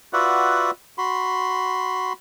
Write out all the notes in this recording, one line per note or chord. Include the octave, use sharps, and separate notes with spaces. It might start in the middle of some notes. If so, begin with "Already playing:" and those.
F4 F#4 B4 D5 E5 F#5
F#4 B5 C6